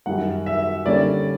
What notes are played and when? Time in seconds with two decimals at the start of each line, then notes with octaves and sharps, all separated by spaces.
0.06 F#2 D#3 G3 F#5
0.46 E5
0.86 D#2 D3 G3 A#3 C#4 D5